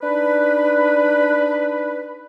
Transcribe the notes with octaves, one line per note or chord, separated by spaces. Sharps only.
D4 D#4 B4